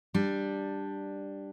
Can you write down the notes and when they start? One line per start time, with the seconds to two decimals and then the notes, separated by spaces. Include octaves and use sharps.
0.14 G3 D4